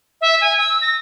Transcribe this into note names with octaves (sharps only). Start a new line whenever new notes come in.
E5
G#5
E6
A#6